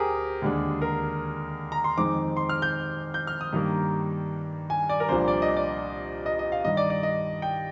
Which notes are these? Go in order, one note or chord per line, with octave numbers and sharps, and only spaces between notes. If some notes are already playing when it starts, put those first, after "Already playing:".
Already playing: D2 C4 G4 G#4 A#4
D#2 D3 G#3 D4
A#4
A#5
C6
F2 D#3 G#3 C4 D#4 D6
C6
F6
G6
G6
F6
D#6
G2 D#3 G3 A#3
G#5
D5
A#4
C2 A#2 F3 A#3 D4 C5
D5
D#5
D5
D#5
D#5
F5
G2 D#3 G3 D#5
D5
D5
D#5
G5